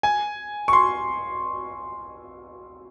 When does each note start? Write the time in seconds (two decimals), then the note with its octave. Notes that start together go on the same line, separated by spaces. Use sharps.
0.03 G#5
0.68 C#6
0.73 C6